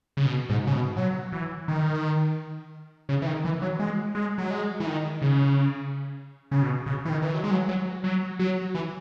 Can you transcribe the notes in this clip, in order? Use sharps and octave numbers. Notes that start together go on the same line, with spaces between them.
C#3
B2
G#2
C#3
B2
F#3
E3
D#3
C#3
E3
D#3
E3
F#3
G#3
G#3
F#3
G#3
E3
D#3
C#3
C#3
B2
C#3
E3
D#3
E3
F#3
G#3
F#3
F#3
F#3
F#3
E3